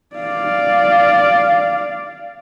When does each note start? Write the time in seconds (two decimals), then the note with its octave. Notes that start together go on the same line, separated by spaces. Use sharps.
0.16 D5 F5